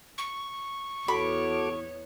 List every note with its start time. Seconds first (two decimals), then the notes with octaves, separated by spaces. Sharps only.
0.18 C#6
1.08 E2 B3 F#4 A4 C#5 B5 D6